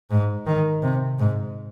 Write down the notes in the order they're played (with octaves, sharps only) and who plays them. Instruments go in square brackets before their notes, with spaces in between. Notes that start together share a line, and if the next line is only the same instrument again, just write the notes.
[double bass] G#2
D#3
C3
G#2